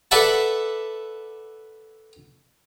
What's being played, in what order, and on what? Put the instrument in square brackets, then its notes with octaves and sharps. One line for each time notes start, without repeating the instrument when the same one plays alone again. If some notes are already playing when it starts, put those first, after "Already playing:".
[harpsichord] A4 B4 D5 E5 F#5 A5